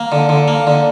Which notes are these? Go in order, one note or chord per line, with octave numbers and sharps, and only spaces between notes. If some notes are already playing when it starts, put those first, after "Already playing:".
Already playing: A#3
D3
D3
A#3
D3